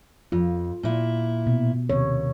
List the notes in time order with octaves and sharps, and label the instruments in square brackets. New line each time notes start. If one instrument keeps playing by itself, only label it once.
[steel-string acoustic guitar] F2 [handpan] F4
[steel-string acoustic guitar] A#2 E4
[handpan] B2
[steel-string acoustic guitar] D#2 [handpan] C3 C#5